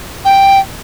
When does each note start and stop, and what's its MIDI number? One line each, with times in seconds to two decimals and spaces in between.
0.25 0.60 79